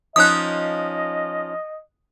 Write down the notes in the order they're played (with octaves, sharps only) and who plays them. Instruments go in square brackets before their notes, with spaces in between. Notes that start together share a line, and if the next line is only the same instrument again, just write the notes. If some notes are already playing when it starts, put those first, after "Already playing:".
[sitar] F3 C#4 D#4 [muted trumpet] D#5 [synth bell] D#6 F#6